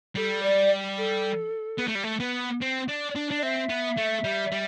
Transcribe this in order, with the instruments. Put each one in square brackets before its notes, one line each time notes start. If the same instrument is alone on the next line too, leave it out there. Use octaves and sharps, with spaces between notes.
[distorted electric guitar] G3 [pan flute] A4
[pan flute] D5
A4
[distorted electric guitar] B3
A3
G3
A3
B3
C4
D4
D4
D4
[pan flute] D5
[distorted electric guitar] C4 [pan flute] E5
[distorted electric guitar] B3
A3
G3
G3